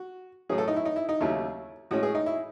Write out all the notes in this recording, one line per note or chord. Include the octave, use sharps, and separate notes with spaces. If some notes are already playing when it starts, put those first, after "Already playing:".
Already playing: F#4
A2 F#3 C#4 G#4
A4
D#4
E4
D#4
E4
D#4
D#2 C#3 F#3 A3 C#4 E4
A2 G#3 C#4 F#4
G#4
D#4
E4